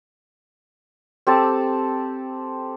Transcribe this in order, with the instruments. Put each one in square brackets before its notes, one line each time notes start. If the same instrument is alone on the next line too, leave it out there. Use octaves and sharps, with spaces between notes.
[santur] C4 G4 A4 A5